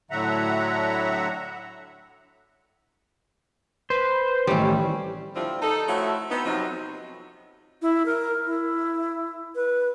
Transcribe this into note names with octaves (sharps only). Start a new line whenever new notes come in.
A2 D3 F#3 E5 F#5 A#5
B4 C5
A1 D#3 E3 G3 C4 C#4
D3 F3 G3 C4 E4 F4
D#4 A4
F3 A3 C4 E4 F#4 C#5
B3 C4 D#4
C3 F3 F#3 B3 C4 D#4
E4
A#4
E4
B4